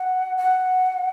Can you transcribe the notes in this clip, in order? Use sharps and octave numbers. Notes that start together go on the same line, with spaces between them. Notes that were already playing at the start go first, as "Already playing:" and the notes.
Already playing: F#5
F#5